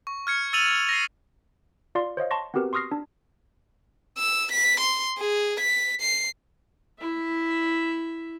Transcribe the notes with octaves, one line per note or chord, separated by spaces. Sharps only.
C#6
F6 G#6 C#7
E6 A6 D#7 F7 F#7
A#6 C7
F4 D5 F5 C6
C5 C#5 D#5 F5
A5 C6 C#6 A#6
B3 C4 F#4 G4 A#4 B4
C6 C#6 D#6 F6 A#6 C7
D4
E6
B6
C6
G#4
B6
C7
E4 E5